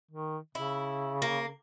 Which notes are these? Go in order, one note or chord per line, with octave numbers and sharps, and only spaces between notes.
D#3
C#3 E4
A#3